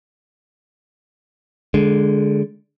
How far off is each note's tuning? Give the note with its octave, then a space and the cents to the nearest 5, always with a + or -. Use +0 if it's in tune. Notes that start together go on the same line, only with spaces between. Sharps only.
D3 -10 G#3 +0